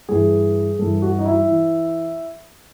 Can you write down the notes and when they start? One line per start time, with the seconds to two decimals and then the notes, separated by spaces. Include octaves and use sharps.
0.09 G2 E3 G#4
0.79 G2 E3 A4
1.02 F#4
1.19 D#4
1.25 E4
1.47 E3